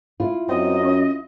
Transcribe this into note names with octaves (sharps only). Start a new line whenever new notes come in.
E4 F4
F#2 C4 D#5
C#4